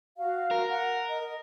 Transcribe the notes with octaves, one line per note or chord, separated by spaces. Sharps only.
F#4 F5
A#4
F#5
D#5